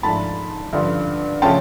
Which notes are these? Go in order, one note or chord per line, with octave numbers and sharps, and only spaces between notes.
G#2 F3 A3 D4 A5 B5
G2 D3 F3
C#3 F3 A3 C#4 G5 A5